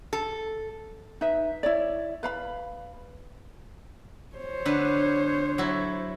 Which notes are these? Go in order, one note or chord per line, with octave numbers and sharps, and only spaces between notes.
A4
D#4 B4 E5
E4 C#5 D5
B4 F5 B5
C5 C#5
D3 B4 F#5
F#3 E4